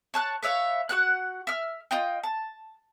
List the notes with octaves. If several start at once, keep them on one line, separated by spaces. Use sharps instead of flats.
C#5 A5 F#6
B4 C#5 E5 F5
F#4 F#5 F#6
E5 F6
F4 D#5 G5
A5